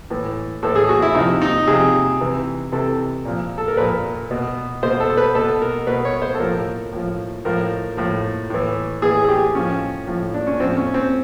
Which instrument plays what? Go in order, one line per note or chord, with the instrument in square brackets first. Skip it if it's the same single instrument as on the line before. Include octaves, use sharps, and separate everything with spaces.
[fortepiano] A2 E3
A2 E3 A4
G#4
F#4
E4
C3 F3 D#4
D#4
C3 F3 G#4
C3 E3
C3 E3 A4
A#2 F3
A4
A#4
A#2 F3 B4
B2
B2 C5
A4
B4
B2 A4
A#4
B2 B4
C#5
C5
A4
A2 F3 A#4
A2 F3
A2 F3 A#4
A2 F3
A2 E3
A2 E3 G#4
G#4
G4
A2 F3 C#4
A2 F3
D4
C#4
A2 F3 C4
C#4
C4